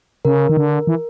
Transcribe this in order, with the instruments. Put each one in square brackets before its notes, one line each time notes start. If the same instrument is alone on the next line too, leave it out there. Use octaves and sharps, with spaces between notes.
[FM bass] C#3 [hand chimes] A#4
[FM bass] D#3
D3
E3